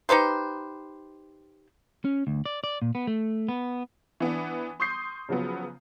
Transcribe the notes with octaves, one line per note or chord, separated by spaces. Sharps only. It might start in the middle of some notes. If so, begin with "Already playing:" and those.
D#4 G4 B4 C5
C#4
D2
D5
D5
A#2
B3
A3
B3
E3 B3 D4
C6 C#6 D#6 G6 C7
C#3 F3 F#3 B3